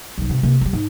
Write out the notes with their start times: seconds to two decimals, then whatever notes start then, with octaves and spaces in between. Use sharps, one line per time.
0.18 D1 B1
0.29 G2 C3
0.43 C3 A#3
0.61 F#3 G3
0.73 G#2